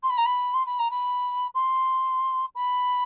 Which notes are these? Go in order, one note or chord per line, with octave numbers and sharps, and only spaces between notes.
C6
B5
A#5
B5
C6
B5
A#5
B5
C6
B5